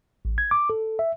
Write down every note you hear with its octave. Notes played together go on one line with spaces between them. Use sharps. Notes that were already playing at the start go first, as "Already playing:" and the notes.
A1
G#6
D6
A4
E5